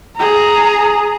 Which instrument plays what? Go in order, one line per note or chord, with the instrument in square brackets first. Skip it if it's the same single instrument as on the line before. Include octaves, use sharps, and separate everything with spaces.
[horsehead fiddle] G#4 A#5